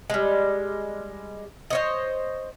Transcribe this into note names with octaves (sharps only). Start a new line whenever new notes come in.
G3 G#3
C5 C#5 D#5